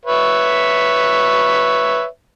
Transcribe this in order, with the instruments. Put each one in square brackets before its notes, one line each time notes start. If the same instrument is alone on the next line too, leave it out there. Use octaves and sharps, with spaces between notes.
[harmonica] B4 C#5 E5